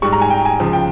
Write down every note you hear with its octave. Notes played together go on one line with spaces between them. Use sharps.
G#2 G3 C#6
A#5
G#5
G5
G#5
C#2 C#3 F3
G5